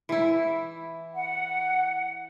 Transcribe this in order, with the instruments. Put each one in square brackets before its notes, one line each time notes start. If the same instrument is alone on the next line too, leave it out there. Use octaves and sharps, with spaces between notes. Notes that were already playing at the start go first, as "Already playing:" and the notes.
[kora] E3 E4
[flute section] F#5